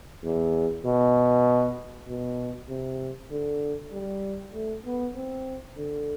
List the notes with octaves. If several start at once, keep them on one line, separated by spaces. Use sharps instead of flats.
E2
B2
B2
C3
D3
G3
A3
B3
C4
D3